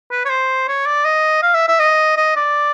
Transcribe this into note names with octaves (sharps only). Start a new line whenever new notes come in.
B4
C#5
C5
C#5
D5
D#5
F5
E5
E5
D#5
D#5
D5